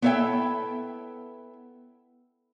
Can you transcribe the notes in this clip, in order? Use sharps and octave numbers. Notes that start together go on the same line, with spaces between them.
B3 E4 A4 C#5 E5 G5